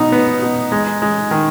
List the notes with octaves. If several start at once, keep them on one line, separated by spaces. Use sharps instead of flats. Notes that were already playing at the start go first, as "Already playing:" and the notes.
Already playing: B2 D#4
B3
B2
G#3
G#3
D#3